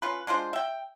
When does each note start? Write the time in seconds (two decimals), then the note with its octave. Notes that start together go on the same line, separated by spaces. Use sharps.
0.02 C#4 F4 B4
0.27 G#3 D4 F4 C5
0.53 E5 G5